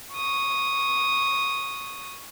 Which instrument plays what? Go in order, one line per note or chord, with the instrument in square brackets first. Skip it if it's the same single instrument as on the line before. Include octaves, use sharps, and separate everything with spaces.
[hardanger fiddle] C#6 D#6